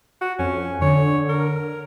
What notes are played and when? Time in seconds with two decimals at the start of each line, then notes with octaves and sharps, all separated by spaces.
0.21 F#4
0.39 F2 C#4
0.82 D3 C#5
1.29 A#4